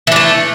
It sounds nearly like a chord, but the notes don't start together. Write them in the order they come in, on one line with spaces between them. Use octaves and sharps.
E3 D4 A3